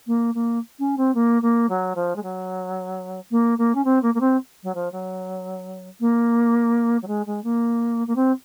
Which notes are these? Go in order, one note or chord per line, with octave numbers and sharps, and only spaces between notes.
A#3
A#3
C#4
C4
A#3
A#3
F#3
F3
G#3
F#3
A#3
A#3
C#4
C4
A#3
A#3
C4
F#3
F3
F#3
A#3
F#3
G#3
G#3
A#3
A#3
C4